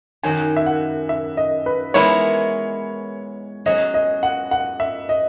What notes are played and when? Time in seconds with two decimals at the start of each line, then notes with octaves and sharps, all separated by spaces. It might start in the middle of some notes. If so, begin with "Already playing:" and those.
0.23 F#2 D#3 F#3 G#5
0.56 E5
0.66 F#5
1.09 E5
1.37 D#5
1.66 B4
1.94 E3 G#3 B3 E4 A#4 C#5
3.66 F#3 C#4 G#4 D#5
3.94 D#5
4.23 F#5
4.51 F#5
4.80 E5
5.09 D#5